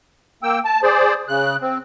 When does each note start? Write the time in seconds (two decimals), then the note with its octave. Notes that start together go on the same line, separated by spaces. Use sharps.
0.43 A#3 G5 E6
0.65 A5
0.83 G#4 C5 D5
1.29 C#3 F#6
1.62 C4